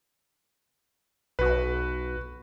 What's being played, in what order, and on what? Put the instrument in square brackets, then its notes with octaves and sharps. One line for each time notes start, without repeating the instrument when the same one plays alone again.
[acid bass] B1 [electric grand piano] F#4 B4